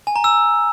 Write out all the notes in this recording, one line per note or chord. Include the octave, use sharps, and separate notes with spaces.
G#5
A#5
E6